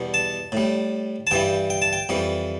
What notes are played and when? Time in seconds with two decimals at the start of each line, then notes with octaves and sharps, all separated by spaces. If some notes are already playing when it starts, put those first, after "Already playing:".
Already playing: E2 B2 G3
0.14 A5
0.52 A2 G3
1.27 A5
1.31 G2 E3 G3 G5
1.70 G5
1.82 A5
1.93 G5
2.09 F2 E3 G3